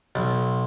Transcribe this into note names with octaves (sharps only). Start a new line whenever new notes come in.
B1